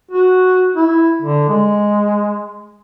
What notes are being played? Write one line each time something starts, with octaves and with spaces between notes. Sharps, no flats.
F#4
E4
D3
G#3